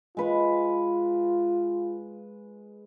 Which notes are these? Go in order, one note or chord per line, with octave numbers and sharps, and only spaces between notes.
G#3 F4 B4 C#6